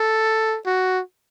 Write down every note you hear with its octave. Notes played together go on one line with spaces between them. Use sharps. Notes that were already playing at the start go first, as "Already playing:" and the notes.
Already playing: A4
F#4